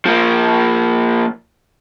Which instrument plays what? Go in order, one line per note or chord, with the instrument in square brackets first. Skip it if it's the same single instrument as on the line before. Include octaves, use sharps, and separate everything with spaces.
[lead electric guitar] F3 A#3